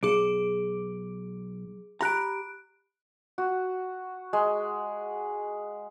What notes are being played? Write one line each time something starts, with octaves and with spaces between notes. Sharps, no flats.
B1 G#4 D6 D7
G4 A#5 B5 F#6 D7
F#4
G#3